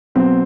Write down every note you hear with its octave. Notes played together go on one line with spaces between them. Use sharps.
B2 F#3 C4